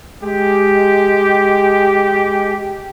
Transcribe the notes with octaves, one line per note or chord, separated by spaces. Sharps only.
G#3 G4